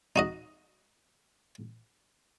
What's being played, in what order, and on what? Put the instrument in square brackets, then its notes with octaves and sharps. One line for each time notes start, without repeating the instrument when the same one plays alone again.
[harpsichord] D#4 F#4 D#5